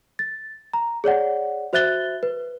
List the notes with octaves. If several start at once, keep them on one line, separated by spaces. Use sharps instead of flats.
A6
A#5
G#4 C#5 D5 F#5
F#4 C5 E5 F#6 A6 G7
B4